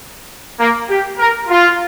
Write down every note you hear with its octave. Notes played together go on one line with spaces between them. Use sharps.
A#3
G4
A#4
F4